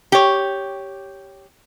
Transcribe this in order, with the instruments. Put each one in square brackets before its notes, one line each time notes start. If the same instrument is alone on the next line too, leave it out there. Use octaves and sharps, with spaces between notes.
[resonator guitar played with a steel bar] G4 C#5